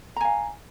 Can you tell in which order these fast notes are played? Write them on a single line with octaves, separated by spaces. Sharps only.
A#5 G#5 F5